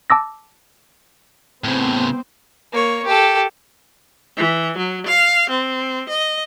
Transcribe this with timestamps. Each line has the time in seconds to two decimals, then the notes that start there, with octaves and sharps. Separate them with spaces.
0.10 A5 D6 E6 A#6
1.64 A2 C#3 B3 C4 C5
2.72 A#3 C#5
3.05 G4 A4
4.37 E3
4.78 F#3
5.06 F5
5.50 C4
6.09 D#5